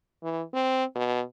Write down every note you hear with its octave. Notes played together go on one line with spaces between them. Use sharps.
E3
C4
B2